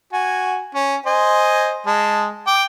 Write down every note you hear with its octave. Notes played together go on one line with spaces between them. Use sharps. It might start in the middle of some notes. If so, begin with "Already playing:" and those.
F#4 G#5
C#4
C5 D#5 G#5
G#3 A5
G5 D6